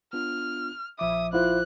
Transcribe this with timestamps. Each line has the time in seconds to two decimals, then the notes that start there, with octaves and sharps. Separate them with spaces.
0.13 B3 D4 F4 F6
0.99 A#1 F3 E5 D6 D#6
1.33 E4 F4 C5 F#6